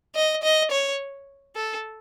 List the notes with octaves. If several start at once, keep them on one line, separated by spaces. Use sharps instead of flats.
D#5
D#5
C#5
A4